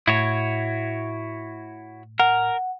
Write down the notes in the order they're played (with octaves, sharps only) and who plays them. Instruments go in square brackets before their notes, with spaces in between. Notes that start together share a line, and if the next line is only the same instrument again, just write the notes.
[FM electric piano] A2 [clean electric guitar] E4 F#4 C#5
[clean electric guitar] A#4 [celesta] F#5